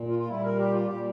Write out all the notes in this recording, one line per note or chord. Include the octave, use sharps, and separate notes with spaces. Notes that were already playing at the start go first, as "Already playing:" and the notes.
Already playing: A#2
F4
F4
A#2 G3 E4
A#4
G4
F4
A#2 G3 G4